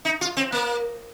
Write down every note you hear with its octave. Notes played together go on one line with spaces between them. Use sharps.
D#4
F4
C4
A#3